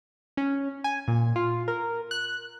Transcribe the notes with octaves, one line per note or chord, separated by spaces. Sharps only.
C#4
G#5
A#2
F4
A#4
F#6